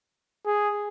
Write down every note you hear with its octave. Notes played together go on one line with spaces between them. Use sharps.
G#4